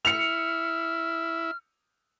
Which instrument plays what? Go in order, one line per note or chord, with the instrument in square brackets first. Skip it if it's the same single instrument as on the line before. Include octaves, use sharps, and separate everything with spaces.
[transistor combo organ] E4 [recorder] F6 [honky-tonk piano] C#7 F7